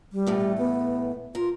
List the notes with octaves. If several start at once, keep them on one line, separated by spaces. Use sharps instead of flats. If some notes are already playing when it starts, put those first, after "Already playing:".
G3
E2 A2 A3
B3
F4 A#4